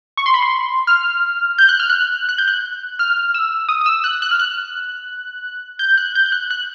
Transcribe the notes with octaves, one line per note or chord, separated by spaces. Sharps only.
C#6
C6
B5
C6
F6
G6
F#6
F6
F#6
F#6
G6
F#6
F6
E6
D#6
D#6
E6
F#6
F#6
F6
F#6
G6
F#6
G6
G6
F#6
F#6